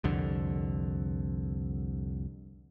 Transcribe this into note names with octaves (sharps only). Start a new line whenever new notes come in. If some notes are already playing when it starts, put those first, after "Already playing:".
C2 F2 D3